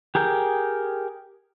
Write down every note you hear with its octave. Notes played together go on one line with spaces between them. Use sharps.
G4 G#4 A#4 G5